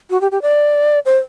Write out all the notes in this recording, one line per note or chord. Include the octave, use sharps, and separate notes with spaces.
F#4
G4
G4
D5
C5